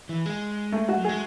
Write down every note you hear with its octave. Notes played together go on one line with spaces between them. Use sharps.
E3
G#3
A3
F#4
F#3
G#3 G#4